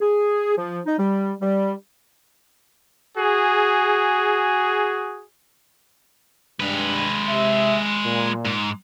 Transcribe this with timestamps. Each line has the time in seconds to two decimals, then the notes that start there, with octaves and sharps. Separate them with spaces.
0.01 G#4
0.57 F3
0.86 D#4
0.99 G3
1.41 G3
3.18 F#4 G#4
6.60 G2 G3 G#3 B4
7.28 C3 E5
8.04 A#2
8.45 G#2